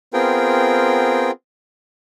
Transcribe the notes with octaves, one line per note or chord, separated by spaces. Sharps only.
B3 C4 F4 G#4 A#4 G5